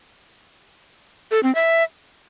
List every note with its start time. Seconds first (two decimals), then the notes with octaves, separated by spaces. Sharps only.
1.31 A4
1.43 C4
1.55 E5